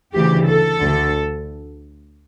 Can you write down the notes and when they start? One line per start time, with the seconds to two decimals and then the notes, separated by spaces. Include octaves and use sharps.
0.15 D2 C#3 E3 G4
0.47 A4
0.79 D2 D3